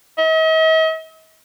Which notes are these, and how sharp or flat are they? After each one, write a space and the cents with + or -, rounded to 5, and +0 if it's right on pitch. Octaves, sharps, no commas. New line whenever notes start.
D#5 +45